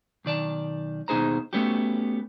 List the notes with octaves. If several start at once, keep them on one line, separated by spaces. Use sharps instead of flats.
B1 D#3 D5 A5
D#2 B2 D#4 G#4 C5 A#5
A3 B3 C#4 F#4 G4